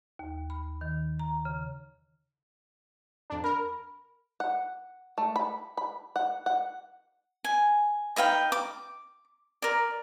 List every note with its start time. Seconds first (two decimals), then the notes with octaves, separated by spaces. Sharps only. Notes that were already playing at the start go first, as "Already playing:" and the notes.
0.19 D#2
0.50 B5
0.81 D#3
1.20 A#5
1.45 C#3
3.30 F2 D4
3.44 A#4 B5
4.40 F#5
5.18 A3
5.36 B5
5.77 B5
6.16 F#5
6.46 F#5
7.44 G#5
8.16 D#4 B4 F5 G5
8.52 D6
9.62 A#4 D5